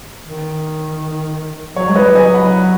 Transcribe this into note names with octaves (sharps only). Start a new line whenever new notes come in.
D#3
F#3 C#5
G#3
B4 D#5
F#3
D#5 G#5
F#5 B5